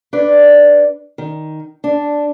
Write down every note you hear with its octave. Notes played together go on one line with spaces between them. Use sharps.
D4 B4 D5
D#3
D4